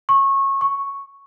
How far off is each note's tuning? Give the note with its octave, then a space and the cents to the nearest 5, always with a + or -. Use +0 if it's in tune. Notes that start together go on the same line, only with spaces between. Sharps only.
C#6 -20
C#6 +0